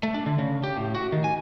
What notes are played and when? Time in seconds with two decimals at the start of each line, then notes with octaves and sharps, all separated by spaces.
0.03 A3
0.14 D4
0.26 D3
0.39 C#3
0.64 G4
0.77 A2
0.95 F#4
1.12 D#3
1.24 G#5